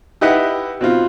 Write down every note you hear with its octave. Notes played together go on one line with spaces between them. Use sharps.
E4 G4 B4 D#5 E5 F#5
B2 C4 F4